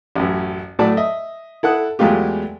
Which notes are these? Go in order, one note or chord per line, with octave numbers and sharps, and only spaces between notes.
A1 F#2
A2 F#3 A3 D5 A5
D#5 E5
E4 A4 F#5 D#6
E2 F#3 G#3 A3 F4 G4